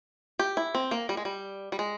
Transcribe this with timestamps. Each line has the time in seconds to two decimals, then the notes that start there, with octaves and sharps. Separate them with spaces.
0.39 G4
0.57 E4
0.75 C4
0.91 A#3
1.09 G3
1.17 G#3
1.25 G3
1.72 G3
1.79 G#3